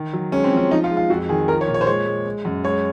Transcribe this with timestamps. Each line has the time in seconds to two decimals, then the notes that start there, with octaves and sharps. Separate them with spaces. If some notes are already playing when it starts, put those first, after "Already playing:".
Already playing: D#3
0.13 F#3
0.32 G#3 C#4
0.44 C4
0.52 F3
0.57 C#4
0.71 F3 D#4
0.84 F4
0.91 G#3
0.97 F4
1.10 F2 F#4
1.29 D#3 G#4
1.48 F3 A#4
1.61 C#5
1.68 A#2
1.74 C#5
1.81 C5
1.87 G#3 C#5
2.06 G#3
2.26 G#3
2.45 F#2
2.64 G#3 C#5